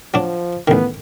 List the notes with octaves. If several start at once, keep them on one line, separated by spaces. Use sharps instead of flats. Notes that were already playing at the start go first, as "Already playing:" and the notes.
F3 F#3 D4
A1 D#3 B3